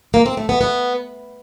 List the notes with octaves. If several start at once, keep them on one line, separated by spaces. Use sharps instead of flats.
A#3
C4
A3
B3
B3